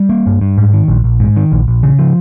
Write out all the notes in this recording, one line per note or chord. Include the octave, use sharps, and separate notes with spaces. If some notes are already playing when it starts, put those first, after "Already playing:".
Already playing: G3
A#3
G2
G2
G#2
D#3
A#1
A#1
G#2
D#3
A#1
A#1
C#3
F3